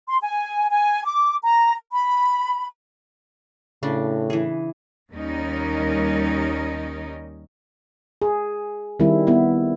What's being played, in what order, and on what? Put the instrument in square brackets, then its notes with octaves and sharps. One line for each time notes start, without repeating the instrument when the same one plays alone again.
[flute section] C6
G#5
G#5
D6
A#5
B5
[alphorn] A2 [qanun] C#3 D4
[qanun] E3 G#4
[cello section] D#2 G3 C#4 D#4 A#4 D#5
[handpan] G#4
D#3 G3 C4 E4
B3 E4